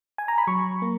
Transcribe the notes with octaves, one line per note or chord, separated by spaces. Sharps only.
G#5
A#5
B5
F#3 C#6
A#3